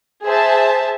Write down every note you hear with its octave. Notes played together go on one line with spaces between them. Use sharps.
G#4 C5 E5 A5